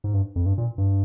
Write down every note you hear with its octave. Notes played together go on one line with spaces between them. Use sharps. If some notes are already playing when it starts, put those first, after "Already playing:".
G#2
G2
F2
G2
A#2
G2